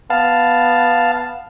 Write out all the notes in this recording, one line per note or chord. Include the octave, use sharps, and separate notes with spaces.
B3 F5 A5